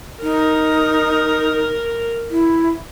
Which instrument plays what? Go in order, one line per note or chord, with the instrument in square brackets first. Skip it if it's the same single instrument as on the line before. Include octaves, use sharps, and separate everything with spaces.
[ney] D#4 [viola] A#4
[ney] E4